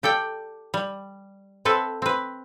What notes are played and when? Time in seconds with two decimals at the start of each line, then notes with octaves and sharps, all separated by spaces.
0.03 G4 A4 D5 G5
0.74 G3
1.65 C4 A4 B4 E5
2.02 C4 B4